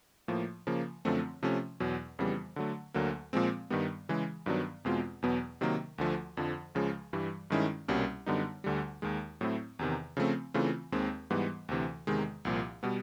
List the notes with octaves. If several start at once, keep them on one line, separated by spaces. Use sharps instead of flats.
A2 F3 A#3
C#3 F3 A#3
F#2 D3 F3 A3 C4
C3 F3 A3 C#4
E2 B2 F#3
F2 C#3 E3 G3 B3
D3 F#3 A3
D2 D3 F#3 A#3
A#2 F3 G#3 C4
G2 D#3 G3 B3
C#3 E3 G#3
G2 D#3 F#3 B3 D4
E2 B2 G#3 C4 F4
E2 B2 F#3 B3
C3 D#3 F#3 A#3
D2 D3 F3 A3
F2 D3 F3
C#2 C#3 F3 G#3
G2 E3 G3
G2 D#3 G#3 C#4 E4
C2 B2 G3 A#3 C#4
F#2 D3 G3 B3 D#4
D2 D3 G3
D#2 D#3 G#3
A2 F#3 A3 C4 E4
E2 C3 D#3
C#3 F3 A3 C4
C#3 E3 A3 C4 F4
D#2 D#3 G#3 C4
G#2 E3 G3 B3
D2 C3 E3
E2 C3 D#3 G#3
C2 A#2 F3
B2 G3 B3